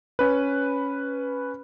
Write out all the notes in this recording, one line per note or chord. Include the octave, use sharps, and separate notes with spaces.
C#4 B4